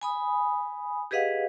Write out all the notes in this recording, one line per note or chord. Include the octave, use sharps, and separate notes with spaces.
G#5 B5 D#6
G4 G#4 B4 D#5 F5 F#5